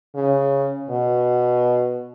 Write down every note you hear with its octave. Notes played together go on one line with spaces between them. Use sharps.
C#3
B2